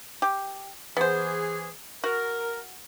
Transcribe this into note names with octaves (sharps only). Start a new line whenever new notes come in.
G4
E3 B3 G#4 C5
F#4 A#4